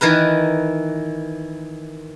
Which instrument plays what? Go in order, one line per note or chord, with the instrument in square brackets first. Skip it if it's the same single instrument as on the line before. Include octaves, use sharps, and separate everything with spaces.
[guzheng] D#3 E3 A#4 B4